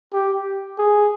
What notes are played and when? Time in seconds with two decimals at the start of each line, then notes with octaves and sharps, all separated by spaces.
0.13 G4
0.78 G#4